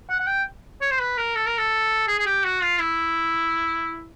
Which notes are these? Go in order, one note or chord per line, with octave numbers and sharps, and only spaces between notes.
F#5
F#5
G5
C#5
C5
B4
A#4
A4
A#4
A4
G#4
G#4
G4
F#4
F4
E4